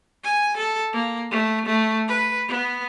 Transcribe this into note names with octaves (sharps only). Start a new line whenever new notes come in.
G#5
A4
A#3
A3
A3
B4
B3